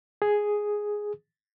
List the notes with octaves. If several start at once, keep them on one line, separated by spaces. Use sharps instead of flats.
G#4